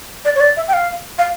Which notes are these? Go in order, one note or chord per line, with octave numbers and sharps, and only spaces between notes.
D5
C#5
D5
E5
G5
F5
F5